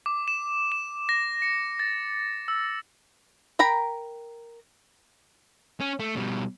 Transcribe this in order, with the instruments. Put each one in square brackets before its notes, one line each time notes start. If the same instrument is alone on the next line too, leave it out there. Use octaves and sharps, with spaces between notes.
[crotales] D6
E7
E7
A#6
C#7
A6
E6
[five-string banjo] A#4 G5 A#5 B5
[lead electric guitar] C#4
A3
B2 G3